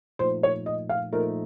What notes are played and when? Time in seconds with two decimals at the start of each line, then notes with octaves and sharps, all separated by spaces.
0.19 A#2 F3 A3 D#4 C5
0.43 C#5
0.66 D#5
0.89 F5
1.12 A#2 F3 A3 D#4 A#4